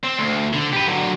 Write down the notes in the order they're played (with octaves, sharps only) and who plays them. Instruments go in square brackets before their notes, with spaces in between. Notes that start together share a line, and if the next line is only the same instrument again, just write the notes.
[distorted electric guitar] C4
D2
D3
G4 B4
D3 F#3